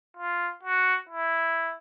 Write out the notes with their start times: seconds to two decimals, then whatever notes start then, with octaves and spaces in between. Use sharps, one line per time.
0.17 F4
0.63 F#4
1.09 E4